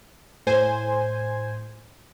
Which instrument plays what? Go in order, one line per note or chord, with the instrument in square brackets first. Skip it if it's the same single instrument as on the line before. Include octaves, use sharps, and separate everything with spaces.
[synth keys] A2 C5 G#5